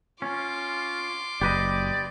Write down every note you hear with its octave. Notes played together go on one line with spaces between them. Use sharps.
C#4 F4 C6 D6
F#1 G4 B4 D5 D#5